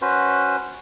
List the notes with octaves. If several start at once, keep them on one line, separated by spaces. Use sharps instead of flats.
C#4 F#4 B4 C5